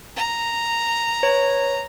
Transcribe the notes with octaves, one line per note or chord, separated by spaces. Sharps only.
A#5
B4 C#5